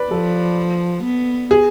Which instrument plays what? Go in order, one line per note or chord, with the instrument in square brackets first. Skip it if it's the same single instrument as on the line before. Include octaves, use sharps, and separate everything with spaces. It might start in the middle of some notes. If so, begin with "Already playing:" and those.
Already playing: [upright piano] B4 D5
[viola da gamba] F3 [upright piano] A4
[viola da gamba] B3
[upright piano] G#4